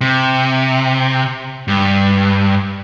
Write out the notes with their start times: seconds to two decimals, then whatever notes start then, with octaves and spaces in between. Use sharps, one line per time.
0.01 C3
1.68 G2